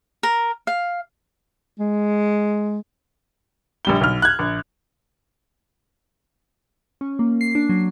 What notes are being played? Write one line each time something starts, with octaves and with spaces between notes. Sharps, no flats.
A#4
F5
G#3
A#1 G3 G7
B1 F6
F#6 G#6
A#1
C#4
A#3
C7
D4
F#3